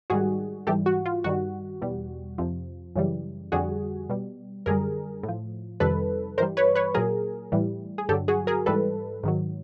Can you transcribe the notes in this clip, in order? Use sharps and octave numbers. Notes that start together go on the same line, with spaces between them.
G#2 D#3 G3 F#4 G#4
G#2 E3 G3 G4 A4
F#4
F4
G2 D#3 G3 F#4
E2 B2 G3
F2 C3 F3
F#2 C#3 E3 G3
F2 D3 G3 F#4 G#4
B2 G3
F#2 D3 G3 G#4 A#4
A2
F3
F2 C3 D#3 G3 A4 B4
G2 E3 G3 A#4 C5
B4 C#5
B4 C#5
A#2 F#3 G#4 A#4
A2 E3 G3
G#4
G2 D3 F#3 G4 A4
F#4 G#4
G#4 A#4
G#2 E3 G3 A4 B4
G#2 D#3 F#3